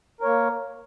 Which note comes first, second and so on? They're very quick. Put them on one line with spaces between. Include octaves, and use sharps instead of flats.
A#4 C#5 A#3